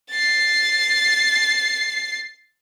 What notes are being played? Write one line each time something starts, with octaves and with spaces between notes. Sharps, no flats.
A6 C7